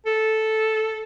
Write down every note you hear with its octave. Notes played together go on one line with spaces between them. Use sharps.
A4